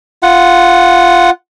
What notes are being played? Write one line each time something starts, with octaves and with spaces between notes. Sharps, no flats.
F4 F#5